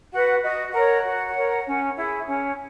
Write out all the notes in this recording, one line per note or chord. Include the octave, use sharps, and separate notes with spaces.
F#4 B4 F#5
F#4 D#5
A#4 C#5 F#5
F#4
A#4 C#5
C#4
E4 G#4
C#4